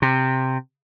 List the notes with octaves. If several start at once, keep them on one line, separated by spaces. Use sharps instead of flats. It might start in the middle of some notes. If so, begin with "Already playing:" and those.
C3